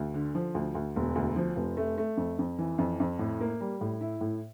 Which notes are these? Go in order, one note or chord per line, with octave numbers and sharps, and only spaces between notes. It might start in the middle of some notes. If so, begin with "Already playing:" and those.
Already playing: D2
D3
F3
D2
D2
E1
D2
F3
F1
A3
A3
F2
F2
E3
F2
F2
A2
A#3
G3
A2
E4
A2